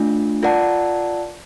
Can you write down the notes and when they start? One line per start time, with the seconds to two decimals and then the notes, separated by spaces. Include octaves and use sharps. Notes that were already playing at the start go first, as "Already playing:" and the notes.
Already playing: A3 D4 F4
0.43 F4 A#4 D5 F#5 A5